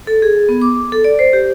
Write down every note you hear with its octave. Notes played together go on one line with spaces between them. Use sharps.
A4
G#4
B3
D6
A4
D5
C5
G4